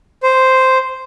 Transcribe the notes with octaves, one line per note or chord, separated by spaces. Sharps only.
C5